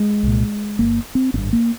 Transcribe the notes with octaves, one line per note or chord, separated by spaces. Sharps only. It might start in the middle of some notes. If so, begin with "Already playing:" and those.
Already playing: G#3
C2 A#2
G1 G2 A#3
C4
G#1 G2 C4
A#3